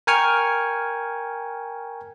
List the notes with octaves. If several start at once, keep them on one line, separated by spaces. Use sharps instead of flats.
A#4 G5 G#5 C#6 F6